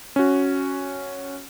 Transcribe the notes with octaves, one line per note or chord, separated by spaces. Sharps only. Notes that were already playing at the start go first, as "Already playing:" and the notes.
C#4 F#4